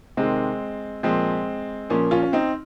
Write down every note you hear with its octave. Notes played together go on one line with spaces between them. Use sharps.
C3 D#3 G#3 C4
A#2 F3 G#3 C4
A#2 F3 A#3 C#4
C#4 F4
C#4
C4 D#4